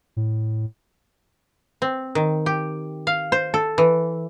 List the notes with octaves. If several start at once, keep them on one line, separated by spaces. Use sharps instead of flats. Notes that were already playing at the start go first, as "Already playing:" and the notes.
A2
C4
D#3
G4
F5
C5
A4
E3